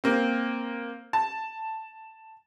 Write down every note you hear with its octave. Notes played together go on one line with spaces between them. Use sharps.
A#3 C4
A5